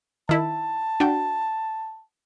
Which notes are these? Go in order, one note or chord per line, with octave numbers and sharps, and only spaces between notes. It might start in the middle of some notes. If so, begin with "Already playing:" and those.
D#3 E4 A5
D4 F#4 G5